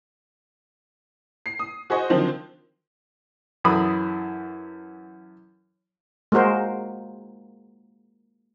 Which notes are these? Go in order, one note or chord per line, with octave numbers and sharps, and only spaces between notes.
C7
D#6
F#4 G#4 C5 D#5 C#6
D3 D#3 F3 F#3 C4 C5
F#2 E3 A4 B5 D#6
G#3 A#3 F#4 A#4 C5